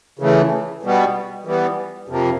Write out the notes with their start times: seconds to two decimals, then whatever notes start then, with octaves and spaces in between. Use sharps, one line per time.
0.19 C#3 E3 A3
0.83 B2 G3 B3
1.45 E3 G3 B3
2.08 F2 C3 F3 A#3